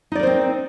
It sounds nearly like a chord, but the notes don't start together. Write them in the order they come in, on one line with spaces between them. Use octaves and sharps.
D#4 D5 A#4 C5 C4